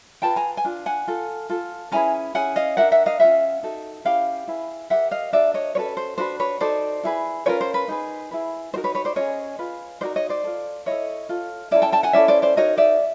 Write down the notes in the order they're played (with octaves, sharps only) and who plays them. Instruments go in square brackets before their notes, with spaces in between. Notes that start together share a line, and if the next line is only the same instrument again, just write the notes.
[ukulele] F4 G#4 B4 G5 A5
G#5 A#5
G#5
D4 F4
F#5 G#5
F4 A4
F4 A4
C#4 E4 G#4 B4 G#5 A#5
C#4 E4 G#4 F#5 G#5
D#5 F5
D4 G4 A#4 E5 F#5
E5 F#5
D#5 F5
C#4 F4 G#4 B4 E5 F#5
D#4 F#4 A4
C#4 E4 G4 F5 G5
E4 G#4 B4
E4 G4 A#4 E5 F#5
D#5 F5
D4 F#4 A#4 D5 E5
C#5 D#5
C#4 F#4 A4 B4 C#5
C5
D4 F#4 B4 C5
B4 C#5
D#4 F#4 A4 C5 D5
E4 G#4 B4
C#4 F4 A#4 B4 C#5
C5
B4
D#4 G#4 B4
E4 G#4 B4
D#4 F#4 A#4 C5
B4 C#5
B4 C#5
C5 D5
C#4 F4 G#4 C#5 D#5
F4 G#4 B4
D#4 F#4 A#4 C5 D5
C#5 D#5
C5 D5
F4 A4
E4 A4 C#5 D#5
F4 A4
C#4 E4 A4 D5 E5
G5 A5
G5 A5
F#5 G#5
C#4 E4 A4 D5 E5
C5 D5
C5 D5
D#4 F#4 A#4 C#5 D#5
D5 E5